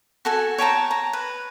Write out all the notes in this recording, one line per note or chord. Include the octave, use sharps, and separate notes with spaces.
F#4 A4 G#5
C#5 G5 A5 A#5
A#5
B4